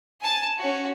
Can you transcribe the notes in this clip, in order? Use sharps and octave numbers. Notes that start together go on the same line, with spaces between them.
G#5 A5
C#4 F#4